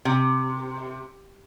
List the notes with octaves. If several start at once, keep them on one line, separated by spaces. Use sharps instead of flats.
C3